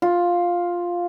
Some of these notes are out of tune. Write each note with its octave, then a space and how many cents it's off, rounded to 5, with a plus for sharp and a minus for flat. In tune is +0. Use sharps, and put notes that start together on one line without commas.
F4 +5